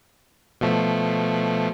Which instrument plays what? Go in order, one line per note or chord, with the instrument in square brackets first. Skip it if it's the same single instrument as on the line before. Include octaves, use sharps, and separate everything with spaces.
[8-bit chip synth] B2 F3 A3